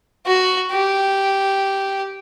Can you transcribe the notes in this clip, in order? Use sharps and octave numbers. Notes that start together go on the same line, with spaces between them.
F#4
G4